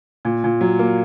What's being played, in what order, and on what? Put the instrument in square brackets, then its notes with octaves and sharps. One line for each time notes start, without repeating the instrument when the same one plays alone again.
[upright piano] A#2
A#2
F#3
A#3